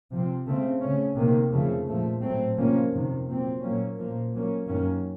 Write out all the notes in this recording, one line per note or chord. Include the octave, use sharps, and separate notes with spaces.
C3 F3 C4
C#3 A3 C4
C#3 A3 C#4
C3 D#3 A#3
F2 C#3 F3 A3
A#2 F3 A3
A2 F#3 A3 C4
C3 F3 A#3 C#4
F2 C3 D#3
A#2 F#3 C4
A#2 F#3 A#3 C#4
A#2 F3 A#3
A#2 F#3 A#3 C#4
F#2 D#3 F#3 A#3 C#4